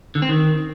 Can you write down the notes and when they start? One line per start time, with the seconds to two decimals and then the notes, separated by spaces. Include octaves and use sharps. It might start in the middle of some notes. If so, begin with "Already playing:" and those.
0.15 D3
0.22 C4
0.29 D#3